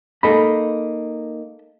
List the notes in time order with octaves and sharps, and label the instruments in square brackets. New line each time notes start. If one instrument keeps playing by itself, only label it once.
[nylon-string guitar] A#3 D#4 [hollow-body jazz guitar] A4 D#5 B5